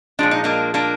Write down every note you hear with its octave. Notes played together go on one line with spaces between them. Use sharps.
A#2 F3 G#3 D4
D#4
A#3 D4
A#3 D4